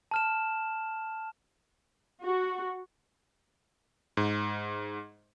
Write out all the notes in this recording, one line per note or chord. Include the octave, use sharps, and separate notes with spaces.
A5 F6 E7
F#4
G#2